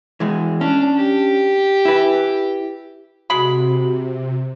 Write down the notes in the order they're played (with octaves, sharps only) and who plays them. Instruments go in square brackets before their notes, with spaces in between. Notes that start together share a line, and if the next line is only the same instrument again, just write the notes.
[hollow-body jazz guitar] E3 G#3
[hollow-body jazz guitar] C#4 [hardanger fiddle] D4
[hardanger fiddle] G4
[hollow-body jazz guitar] E4 B4
[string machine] C3 [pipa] G#3 B5 [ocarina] F#4